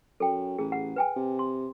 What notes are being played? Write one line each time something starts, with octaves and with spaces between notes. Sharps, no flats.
F#2 A4 G5
A1 G#4
F#5
B4 G5 G#5
C3
C6